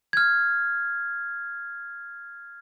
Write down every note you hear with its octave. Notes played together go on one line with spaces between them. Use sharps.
F6 G#6